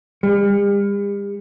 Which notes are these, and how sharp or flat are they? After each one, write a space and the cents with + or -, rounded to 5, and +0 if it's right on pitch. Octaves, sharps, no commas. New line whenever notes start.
G3 +45